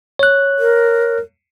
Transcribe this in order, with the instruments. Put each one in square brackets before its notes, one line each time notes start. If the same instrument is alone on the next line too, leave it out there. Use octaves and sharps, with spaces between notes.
[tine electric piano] C#5 F#6
[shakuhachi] A#4